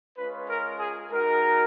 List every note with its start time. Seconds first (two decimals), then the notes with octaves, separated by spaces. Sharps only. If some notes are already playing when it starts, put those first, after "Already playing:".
0.17 G#3 C#4 F4 B4
0.48 A#4
0.79 G#4
1.11 G#3 D#4 F#4 A#4